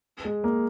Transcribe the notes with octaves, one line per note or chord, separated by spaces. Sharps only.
G#3
A#3